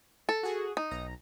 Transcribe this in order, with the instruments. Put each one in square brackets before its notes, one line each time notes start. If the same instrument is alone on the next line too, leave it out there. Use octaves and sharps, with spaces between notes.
[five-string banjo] A4
[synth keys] F#4 G#4
[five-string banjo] D#4
[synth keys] B1 A#5